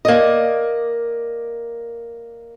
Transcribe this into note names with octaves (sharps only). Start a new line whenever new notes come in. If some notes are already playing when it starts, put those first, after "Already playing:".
A#3 D5 D#5